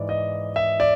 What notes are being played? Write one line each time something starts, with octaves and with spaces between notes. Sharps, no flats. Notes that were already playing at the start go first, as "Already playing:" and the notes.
Already playing: G#2 E3 D5
D#5
E5
D5